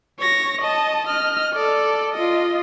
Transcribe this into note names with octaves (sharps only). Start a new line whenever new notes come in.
C#5 A#6
D#5 A5
D#5 F6
A4 D5
F4 D#5